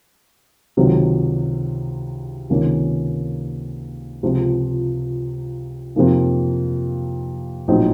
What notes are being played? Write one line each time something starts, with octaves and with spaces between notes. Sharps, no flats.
C#2 C3 D#3 F#3
C#2 C3 D#3 A#3 C#4
C#2 C3 F3
F2 C3 F3 A#3 D#4
A#1 A2 F#3 C4 D#4